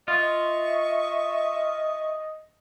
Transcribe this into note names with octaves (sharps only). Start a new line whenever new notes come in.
F4 D#5 E5 C#6